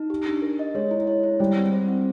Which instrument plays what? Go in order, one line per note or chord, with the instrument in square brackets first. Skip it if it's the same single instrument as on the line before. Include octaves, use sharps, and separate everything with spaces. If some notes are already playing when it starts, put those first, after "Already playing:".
Already playing: [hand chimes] D#4
G4
D4
A#4
D#5
[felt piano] G#3 [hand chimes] C#5
[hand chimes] E4
C#5
E4
[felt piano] G3 [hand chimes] C5
[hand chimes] C4
C5
C4